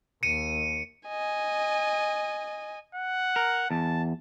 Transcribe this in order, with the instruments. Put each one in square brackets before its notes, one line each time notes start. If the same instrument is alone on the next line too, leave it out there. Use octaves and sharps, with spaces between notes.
[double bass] D#2 [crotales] C#7 D#7
[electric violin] D#5 G#5
[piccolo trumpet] F#5
[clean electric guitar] A#4
[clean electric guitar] E2 [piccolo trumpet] A5